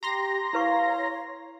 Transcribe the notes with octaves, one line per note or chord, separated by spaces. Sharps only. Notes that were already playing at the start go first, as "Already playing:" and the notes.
G4 A#5 C6 A#6
E4 B4 C#5 F5 C#6